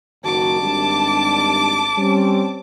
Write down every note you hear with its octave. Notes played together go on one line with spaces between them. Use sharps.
F#1 D#3 F#4 A5 D6
G#1 G3 D4
G3 C4 C#4